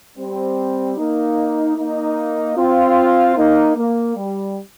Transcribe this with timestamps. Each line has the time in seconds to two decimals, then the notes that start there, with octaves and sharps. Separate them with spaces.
0.18 G3 C4
0.98 A#3 D#4
1.77 A#3 D#4
2.57 C4 F4
3.37 A#3 D#4
3.77 A#3
4.17 G3